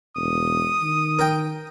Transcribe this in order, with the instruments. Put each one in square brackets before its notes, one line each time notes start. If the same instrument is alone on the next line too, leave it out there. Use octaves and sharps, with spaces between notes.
[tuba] E1 [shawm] D#6
[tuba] D#3
[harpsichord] A#4 G5